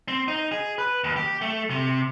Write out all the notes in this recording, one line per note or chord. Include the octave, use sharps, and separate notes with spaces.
C4
D#4
G#4
B4
D#2
G4
A3
C3